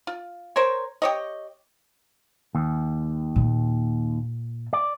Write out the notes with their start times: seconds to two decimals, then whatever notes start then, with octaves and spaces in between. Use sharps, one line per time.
0.07 F4
0.56 A#4 C5 C#5
1.02 G4 C#5 D#5
2.55 D#2
3.36 A#2
4.73 D5